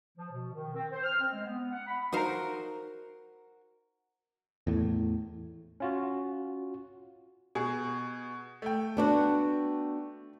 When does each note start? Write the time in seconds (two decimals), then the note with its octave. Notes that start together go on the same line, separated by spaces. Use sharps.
0.18 F3
0.32 B2
0.53 D#3
0.75 C4
0.92 C5
1.04 F6
1.20 C4
1.32 G#3
1.45 B3
1.72 F#5
1.87 B5
2.12 D#4 F#4 A#4 C5 F5
4.67 E2 A2
5.80 C#4 F4 F#4
7.55 B2 G#4
8.62 A3 G5
8.97 B3 D4 F#4